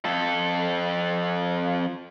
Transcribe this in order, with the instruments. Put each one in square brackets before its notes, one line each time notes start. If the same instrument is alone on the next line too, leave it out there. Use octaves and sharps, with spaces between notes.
[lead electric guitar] F2 A4